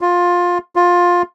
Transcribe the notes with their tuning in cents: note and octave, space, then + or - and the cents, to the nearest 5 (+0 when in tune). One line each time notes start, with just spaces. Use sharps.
F4 +15
F4 +15